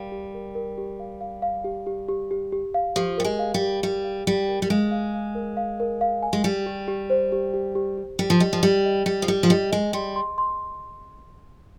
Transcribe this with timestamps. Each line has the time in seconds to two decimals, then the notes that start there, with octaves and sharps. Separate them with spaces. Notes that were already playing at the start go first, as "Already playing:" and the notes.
Already playing: G3 A#4 F5
0.12 G4
0.34 A#4
0.55 A#4
0.78 G4
1.00 F5
1.21 F5
1.42 F5
1.64 G4
1.86 G4
2.09 G4
2.31 G4
2.52 G4
2.74 F5
2.96 F3 G4
3.18 G3 A#4
3.25 G#3
3.39 F5
3.54 G3
3.61 G4
3.83 G3 G4
4.04 F5
4.27 G3 G4
4.49 A#4
4.62 G3
4.70 G#3 F5
4.91 F5
5.14 F5
5.35 A#4
5.57 F5
5.80 A#4
6.01 F5
6.23 G#5
6.33 G#3
6.44 G3 G4
6.66 G4
6.88 G4
7.10 C5
7.32 G4
7.54 G4
7.75 G4
7.98 G4
8.19 G3 G4
8.30 F3
8.40 G3 D#5
8.53 F3
8.63 G3 G4
8.85 D#5
9.06 G3 D#5
9.22 F3
9.28 G3 G4
9.43 F3
9.50 G3 D#5
9.72 G#3 D#5
9.93 G3 C6
10.16 C6
10.38 C6